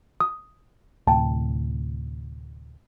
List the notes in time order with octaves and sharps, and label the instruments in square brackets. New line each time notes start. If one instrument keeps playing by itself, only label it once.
[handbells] D#6
[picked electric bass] D2 A2 C3 [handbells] G5 A5